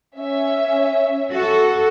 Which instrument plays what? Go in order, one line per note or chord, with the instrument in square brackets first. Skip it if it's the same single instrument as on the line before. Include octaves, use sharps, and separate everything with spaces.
[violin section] C#4 E5
[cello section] F#4 A4